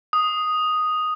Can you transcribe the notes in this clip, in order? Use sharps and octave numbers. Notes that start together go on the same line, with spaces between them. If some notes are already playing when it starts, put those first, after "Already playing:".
D#6